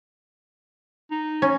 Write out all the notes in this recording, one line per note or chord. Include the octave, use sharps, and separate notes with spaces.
D#4
C#4